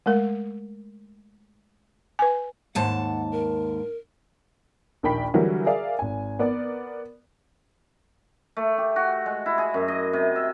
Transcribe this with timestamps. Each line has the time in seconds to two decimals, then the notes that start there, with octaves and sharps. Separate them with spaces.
0.06 G#3 A3 A#4
2.19 B4 G#5
2.75 D#2 G#2 F#5 A5
3.32 A#4
5.03 A#1 D#2 A#4 G5 B5 B6
5.34 D3 E3 F#3 G3 F#4 A#4
5.66 G#4 A#4 D5 E5 F5
5.99 G#1 G#5
6.39 B3 A#4 D5
8.57 A3
8.78 G4
8.96 F#4
9.26 G#3
9.46 E4
9.58 G#4
9.74 F#2
9.88 D#5
10.13 C3
10.36 E5